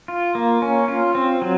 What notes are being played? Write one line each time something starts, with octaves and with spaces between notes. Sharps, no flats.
F4
A#3
C#4
F4
C4
F#3